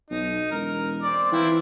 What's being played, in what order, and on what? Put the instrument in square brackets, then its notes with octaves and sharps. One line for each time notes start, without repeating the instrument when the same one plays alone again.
[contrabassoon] B1 [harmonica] D#4
[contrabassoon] E1 [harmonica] A#4
[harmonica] C4 D5
[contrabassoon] E3 [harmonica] C4 E4 F4